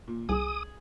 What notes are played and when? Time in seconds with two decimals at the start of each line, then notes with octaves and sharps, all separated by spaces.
0.08 A#2
0.29 C2 G#4 D#6